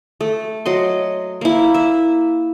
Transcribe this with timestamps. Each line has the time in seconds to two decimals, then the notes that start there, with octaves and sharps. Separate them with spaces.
0.21 A3
0.66 F#3 D#5 C6
1.41 A#3 E4
1.74 E5